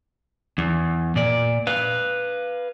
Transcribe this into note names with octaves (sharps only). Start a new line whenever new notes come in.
E2
A#2 D5
B4 F5